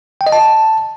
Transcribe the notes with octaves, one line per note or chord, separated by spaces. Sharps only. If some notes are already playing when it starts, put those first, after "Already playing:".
G5
D#5
A5